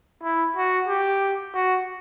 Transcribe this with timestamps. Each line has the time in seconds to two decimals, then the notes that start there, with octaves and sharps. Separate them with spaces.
0.23 E4
0.56 F#4
0.88 G4
1.54 F#4